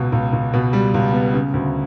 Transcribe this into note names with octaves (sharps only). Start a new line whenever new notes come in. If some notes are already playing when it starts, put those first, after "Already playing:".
Already playing: C#2 B2
C#2
C#2
B2
G3
C#2
B3
C#3
D2